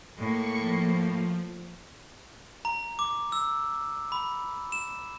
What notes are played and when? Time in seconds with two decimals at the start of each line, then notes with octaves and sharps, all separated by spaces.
0.17 A2 A#3 C#6 C#7
0.58 F3
2.65 A#5
2.99 D6
3.32 E6
4.12 B5
4.72 E7